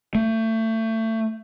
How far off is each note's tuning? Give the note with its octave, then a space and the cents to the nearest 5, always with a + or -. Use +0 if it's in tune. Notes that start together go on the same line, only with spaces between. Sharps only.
A3 +25